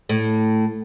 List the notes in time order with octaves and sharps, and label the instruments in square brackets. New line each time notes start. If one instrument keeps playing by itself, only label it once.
[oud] A2